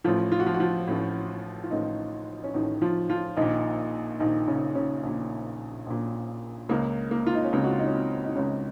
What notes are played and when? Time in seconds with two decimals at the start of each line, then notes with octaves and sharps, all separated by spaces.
0.04 A1 A2 F3 F4
0.32 F4
0.40 F#4
0.46 F3 F4
0.54 F#4
0.60 F3 F4
0.87 A1 A2
1.64 F4
1.71 A1 A2 D#3 D#4
2.44 C#4
2.54 A1 A2 D#3 D#4
2.82 F3 F4
3.09 F3 F4
3.37 A#1 A#2 D#3 D#4
4.20 A#1 A#2 D#3 D#4
4.48 C#3 C#4
4.75 C#3 C#4
5.03 A#1 A#2
5.87 A#1 A#2
6.69 C#2 C#3 A#3
7.11 A#3
7.26 F4
7.35 D#4
7.44 C#4
7.53 C#2 C#3 C4
7.64 F#4
7.71 F4
7.79 D#4
7.86 C#4
7.94 C4
8.25 D#4
8.36 C#2 C#3 C#4